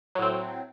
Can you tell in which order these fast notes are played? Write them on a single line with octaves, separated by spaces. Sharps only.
F#3 A2 C4